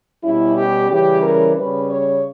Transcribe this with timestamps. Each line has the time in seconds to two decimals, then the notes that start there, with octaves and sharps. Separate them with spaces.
0.23 B2 G3 C#4 E4
0.57 G4
0.90 C#3 E3 G3 C#4 G4
1.23 A#4
1.56 C#3 G3 C#4 B4
1.89 C#5